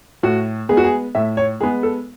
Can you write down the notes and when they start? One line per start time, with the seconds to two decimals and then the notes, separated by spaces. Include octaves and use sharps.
0.23 A2 F#4
0.69 G#3 B3 G#4
0.77 F#4
0.84 G#4
1.15 A2 E5
1.37 C#5
1.60 G#3 G#4
1.63 B3
1.83 A4